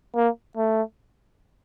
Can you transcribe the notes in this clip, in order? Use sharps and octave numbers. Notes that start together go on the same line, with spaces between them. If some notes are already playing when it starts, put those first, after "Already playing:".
A#3
A3